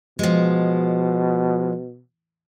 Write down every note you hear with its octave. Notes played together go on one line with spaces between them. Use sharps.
B2 F3 G#3